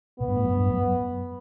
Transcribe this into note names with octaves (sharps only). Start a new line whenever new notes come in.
B2 B3
G2
A2
F#2
G2
F#2